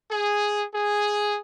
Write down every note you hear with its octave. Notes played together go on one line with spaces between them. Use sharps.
G#4
G#4